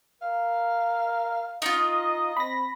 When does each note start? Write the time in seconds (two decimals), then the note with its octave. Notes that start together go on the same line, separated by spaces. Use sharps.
0.22 A#4 F5
1.62 D#4 F4 D#5
2.37 C4 B5 A#6